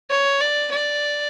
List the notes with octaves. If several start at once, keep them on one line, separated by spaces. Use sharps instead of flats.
C#5
D5
D5